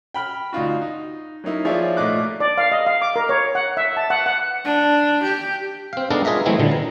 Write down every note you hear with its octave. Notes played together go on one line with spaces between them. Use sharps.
G5 B5 F6
D2 D#4 F4 F#4
D#4
F#3 A#3 D#4 E4
F3 G#4 C#5 D5 E5 F5
G#1 A#2 A3 D#5 D6 F#6
D5
F5
D#5
F5
D6
A#4
C#5
F#5
E5
A5
F#5
F#5
D4
G4
C4 F5
G#3 B3 D4 D#4 A4 A#4
F4 G#4 A#4 D#5 E5
E3 F#3 G#3 A3 C4 E4
A#2 D3 D#3
A#5